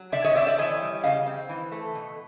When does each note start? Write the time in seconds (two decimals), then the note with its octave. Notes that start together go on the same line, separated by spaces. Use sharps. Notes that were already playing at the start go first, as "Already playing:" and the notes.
Already playing: F#3
0.12 C3 D5 E5
0.24 C#5 D#5
0.36 C4 D5 E5
0.47 D5 E5
0.58 E3 C#5 D#5
0.81 G3
1.04 C#3 D#5 F5
1.26 C4
1.49 E3
1.72 A3
1.95 B2